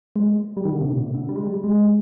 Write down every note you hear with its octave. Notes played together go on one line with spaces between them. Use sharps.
G#3
G3
D#3
D3
C3
A#2
C3
D3
G3
G#3
G3
G#3